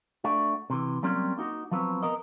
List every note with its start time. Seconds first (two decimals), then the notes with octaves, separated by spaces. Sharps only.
0.24 A3 D4 F#4
0.70 C3 E3
1.03 F#3 G3 A#3 C4 C#4
1.37 A#3 D#4 F#4
1.71 F3 F#3 B3 C4
2.03 B3 A#4 D#5